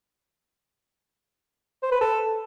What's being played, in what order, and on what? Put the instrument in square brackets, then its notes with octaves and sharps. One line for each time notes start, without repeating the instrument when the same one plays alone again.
[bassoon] C5
B4
A4